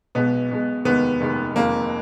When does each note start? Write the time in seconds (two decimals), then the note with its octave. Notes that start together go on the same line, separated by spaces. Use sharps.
0.15 B1 B2 G#3 B3
0.51 B1 B2 G#3
0.85 F1 D#2 D#3 G#3 B3
1.20 F1 D#2 D#3 G#3
1.55 F1 F2 D#3 G#3 A#3